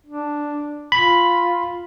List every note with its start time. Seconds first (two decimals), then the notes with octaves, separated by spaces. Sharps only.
0.06 D4
0.92 F4 B5